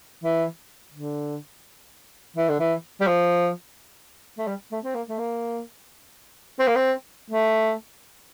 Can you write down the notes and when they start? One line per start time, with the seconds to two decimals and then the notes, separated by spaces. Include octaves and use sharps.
0.23 E3
0.94 D3
2.36 E3
2.49 D3
2.60 E3
3.01 G3
3.07 F3
4.38 A3
4.47 G3
4.72 A3
4.84 C4
4.95 A#3
5.09 A3
5.19 A#3
6.60 C4
6.67 A#3
6.76 C4
7.30 A3